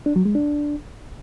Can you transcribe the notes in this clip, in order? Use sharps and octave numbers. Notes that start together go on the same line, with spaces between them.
D4
F#3
G#3
D4